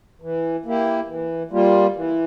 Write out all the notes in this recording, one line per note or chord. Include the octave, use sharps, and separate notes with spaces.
E3
A#3 E4 G4
E3
G3 A#3 F4
E3